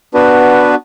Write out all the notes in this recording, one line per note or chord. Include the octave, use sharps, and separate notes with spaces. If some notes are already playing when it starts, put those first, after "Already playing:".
B3 D4 F#4 B4